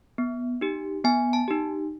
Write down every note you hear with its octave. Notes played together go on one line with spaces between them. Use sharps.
B3
D#4 G4
B3 G#5
A5
D#4 G4